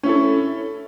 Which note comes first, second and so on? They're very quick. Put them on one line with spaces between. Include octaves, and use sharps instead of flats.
C#4 E4 A4